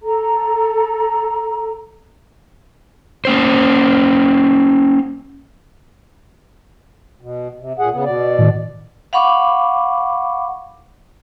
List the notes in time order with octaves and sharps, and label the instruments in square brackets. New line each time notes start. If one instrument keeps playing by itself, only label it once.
[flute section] A4 A#5
[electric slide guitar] A#3 C#4 C5
[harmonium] B2
C3
A#2 G#4 F#5
C#3 B3
B2 D5
[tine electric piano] A2 D#3
[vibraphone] F5 F#5 B5 C#6 D6